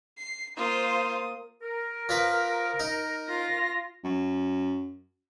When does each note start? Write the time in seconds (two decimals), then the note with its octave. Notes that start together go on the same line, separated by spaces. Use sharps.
0.18 C7
0.56 A#3 F4 C5 D#6
1.62 A#4
2.09 F3 B4
2.80 D#4
3.27 F4 A#6
4.04 F#2